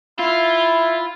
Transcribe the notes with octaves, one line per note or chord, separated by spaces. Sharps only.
E4 F4